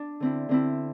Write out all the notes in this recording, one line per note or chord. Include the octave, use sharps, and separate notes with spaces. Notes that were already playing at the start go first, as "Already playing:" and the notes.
Already playing: D4
D3 C4 E4
D3 C4 E4